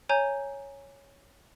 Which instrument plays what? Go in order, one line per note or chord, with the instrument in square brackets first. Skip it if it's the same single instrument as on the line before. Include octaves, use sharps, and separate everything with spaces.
[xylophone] C#5 G#5 A#5 G6